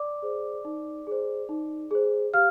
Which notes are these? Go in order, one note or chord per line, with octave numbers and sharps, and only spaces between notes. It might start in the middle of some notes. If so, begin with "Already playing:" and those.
Already playing: D5 D6
G#4 C5
D#4
G#4 C5
D#4
G#4 C5
G4 F5 F6